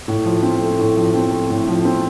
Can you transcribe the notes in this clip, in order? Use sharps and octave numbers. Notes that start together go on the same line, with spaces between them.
A2
F3
C4
A3
A2
F3
C4
A3
A2
F3
C4